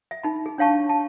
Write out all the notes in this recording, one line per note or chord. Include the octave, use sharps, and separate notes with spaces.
E5
D#4 B5
G#4
D4 C#5 F5 A5 C#6
A5